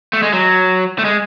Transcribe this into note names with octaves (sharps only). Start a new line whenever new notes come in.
A3
G#3
F#3
A3
G#3